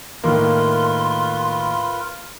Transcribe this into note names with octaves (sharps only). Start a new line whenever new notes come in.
A2 D#3 A#3 F4 A#4 B4 C6